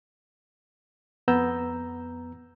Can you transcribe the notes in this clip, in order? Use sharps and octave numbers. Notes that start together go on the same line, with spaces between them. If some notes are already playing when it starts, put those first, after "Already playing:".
F2 B3 A#5 E6 G6